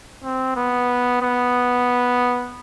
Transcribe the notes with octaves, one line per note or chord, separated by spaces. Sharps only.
C4
B3
B3